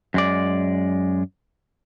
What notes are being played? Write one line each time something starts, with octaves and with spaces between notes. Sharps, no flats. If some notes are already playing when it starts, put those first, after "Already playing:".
F#2 G#3 D5